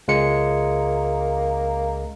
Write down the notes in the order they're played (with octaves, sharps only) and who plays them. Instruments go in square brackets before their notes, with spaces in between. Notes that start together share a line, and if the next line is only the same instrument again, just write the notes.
[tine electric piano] C#2 G#3 C#7 [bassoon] A#3